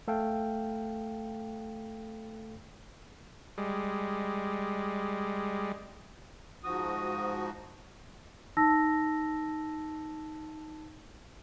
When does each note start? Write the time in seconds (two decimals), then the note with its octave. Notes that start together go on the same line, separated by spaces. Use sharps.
0.08 A3 A4 F5 G5
3.58 G3 G#3
6.64 G#2 F3 F#4 D#6
8.57 D#4 A5 E6 A#6